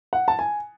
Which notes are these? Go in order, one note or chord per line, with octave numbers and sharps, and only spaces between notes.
F#5
A5
G#5